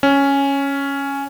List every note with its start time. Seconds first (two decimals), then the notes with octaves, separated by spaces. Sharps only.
0.03 C#4